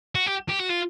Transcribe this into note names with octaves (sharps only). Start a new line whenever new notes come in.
F#4
G4
G4
F#4
F4